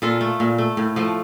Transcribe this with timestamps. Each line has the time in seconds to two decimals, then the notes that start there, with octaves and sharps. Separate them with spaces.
0.02 A#2 F4 A4
0.21 A3
0.40 A#2
0.58 A3
0.77 A2
0.96 F3 A3